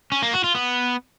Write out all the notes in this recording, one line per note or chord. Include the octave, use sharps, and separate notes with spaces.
C#4
A#3
F#4
F4
B3